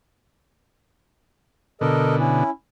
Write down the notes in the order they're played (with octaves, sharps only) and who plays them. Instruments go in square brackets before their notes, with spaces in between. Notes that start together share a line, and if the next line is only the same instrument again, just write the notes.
[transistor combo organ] B2 D3 [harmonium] A4 A#4 D#5
[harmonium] C#4 E4